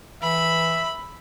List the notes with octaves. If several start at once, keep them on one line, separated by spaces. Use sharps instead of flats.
E3 E5 B5